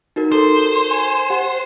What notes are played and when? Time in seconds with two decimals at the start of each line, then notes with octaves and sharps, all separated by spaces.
0.16 D#4 F#4 A#4
0.32 A4 A#4 C5
0.91 G#5
1.30 G4 F#5